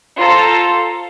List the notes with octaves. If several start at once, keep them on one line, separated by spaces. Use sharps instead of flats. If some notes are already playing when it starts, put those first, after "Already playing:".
F4 A4 C5 A#5